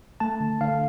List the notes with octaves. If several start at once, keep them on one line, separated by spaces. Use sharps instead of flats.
A3 A5
D3
D3 F5